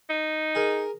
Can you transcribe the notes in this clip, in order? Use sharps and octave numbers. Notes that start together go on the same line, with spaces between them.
D#4
G#4 A#4